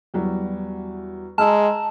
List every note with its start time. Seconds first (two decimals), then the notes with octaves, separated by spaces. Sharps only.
0.14 E2 F#3 G3
1.38 G#3 A5 A#5 E6 F6